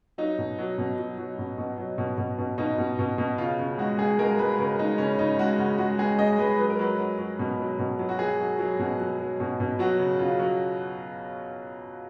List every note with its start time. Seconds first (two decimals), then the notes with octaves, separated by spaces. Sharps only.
0.18 F#3 D#4
0.38 B2
0.59 F#3
0.78 B2
0.98 F#3
1.18 F#3
1.39 B2
1.58 B2
1.78 F#3
1.98 B2
2.18 B2
2.38 B2
2.58 B2 D#4
2.78 B2
2.99 B2
3.18 B2
3.38 C#3 F4
3.59 C#3
3.78 G#3 F#4
3.98 G#3 G#4
4.19 G#3 A#4
4.39 G#3 B4
4.59 C#3 A#4
4.79 G#3 D#4
4.98 C#3 C#4
5.18 C#3 D#4
5.39 G#3 F#4
5.58 C#3 F#4
5.78 G#3 F#4
5.99 G#3 G#4
6.18 G#3 D#5
6.38 G#3 B4
6.58 F#3 B4
6.70 A#4
6.79 F#3 B4
6.98 F#3
7.18 F#3
7.39 B2
7.59 F#3
7.79 B2
7.99 F#3
8.09 F#4
8.19 F#3 G#4
8.40 F#3
8.59 F#3
8.79 B2
9.00 F#3
9.19 F#3
9.40 B2
9.60 B2
9.79 F#3 F#4
9.99 C#3
10.19 C#3 F4
10.39 F#3